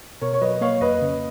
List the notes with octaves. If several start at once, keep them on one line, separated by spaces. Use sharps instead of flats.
B2 A#4 C#5
C#5
F#3 B4 D#5
A#3 C#5 F5
F2 B4 D#5
C#3